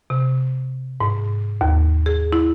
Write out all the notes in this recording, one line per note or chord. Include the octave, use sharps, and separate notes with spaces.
C3
G#2
D#2
G#4
E4